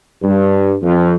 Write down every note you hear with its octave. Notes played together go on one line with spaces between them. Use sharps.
G2
F2